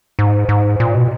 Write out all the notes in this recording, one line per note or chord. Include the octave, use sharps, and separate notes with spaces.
G#2
G#2
A#2
B2